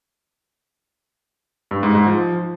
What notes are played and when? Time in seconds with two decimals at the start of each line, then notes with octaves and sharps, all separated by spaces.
1.71 G2
1.83 G#2
1.95 G#2
2.07 F3